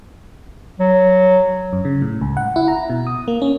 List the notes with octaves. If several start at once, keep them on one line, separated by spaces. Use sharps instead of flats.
F#3
F#2
C#3
A2
C#2
F#5
E4
A#5
B2
D#6
A#3
C#4